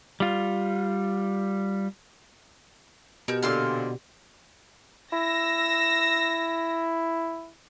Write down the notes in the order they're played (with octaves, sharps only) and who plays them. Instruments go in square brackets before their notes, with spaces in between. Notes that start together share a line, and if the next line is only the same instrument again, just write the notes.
[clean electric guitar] G3 F4
[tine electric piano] B2 [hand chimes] G4 [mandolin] A#4 G6
[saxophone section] A#2 D3 [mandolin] C4 C6 F6
[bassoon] E4 [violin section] E6 A#6